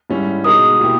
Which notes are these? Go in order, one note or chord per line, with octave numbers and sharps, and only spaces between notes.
G#2 G3 C#4 E4
B2 G#3 D#4 A#4 D#6
B2 A#3 E4 G4